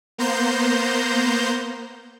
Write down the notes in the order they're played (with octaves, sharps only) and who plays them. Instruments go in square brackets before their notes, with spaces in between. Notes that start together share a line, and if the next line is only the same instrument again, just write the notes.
[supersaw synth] A#3 B3 C5 A#5 C6 G6